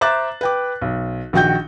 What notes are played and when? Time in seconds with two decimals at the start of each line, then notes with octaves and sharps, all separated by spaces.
0.01 C5 E5 A#5 D6 F#6 A6
0.41 B4 G5 D6
0.81 B1
1.33 A#1 D#3 F#4 G5 G6